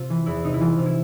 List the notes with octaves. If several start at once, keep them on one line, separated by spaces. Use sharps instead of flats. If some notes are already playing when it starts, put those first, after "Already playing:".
Already playing: C3 F4
E3
E2 E4
C3 D#4
E4
E3 F4
C3
E4